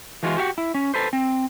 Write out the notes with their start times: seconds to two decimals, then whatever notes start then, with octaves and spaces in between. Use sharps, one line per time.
0.23 E3 G#3 F4 F#4
0.37 F#4 G4 E5 F#5
0.58 E4
0.74 C#4
0.94 A4 B4 C5
1.13 C4